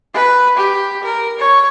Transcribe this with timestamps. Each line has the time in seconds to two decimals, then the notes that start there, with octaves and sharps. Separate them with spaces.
0.14 B4
0.57 G4
1.04 A#4
1.39 C#5